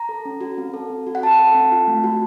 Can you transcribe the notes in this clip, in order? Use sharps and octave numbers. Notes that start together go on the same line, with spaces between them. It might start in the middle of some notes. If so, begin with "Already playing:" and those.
Already playing: A#5
A4
C#4
F#4
C4
A4
C4
F#4
F#5
C4 A5
A4
C4
F4
A3
F#4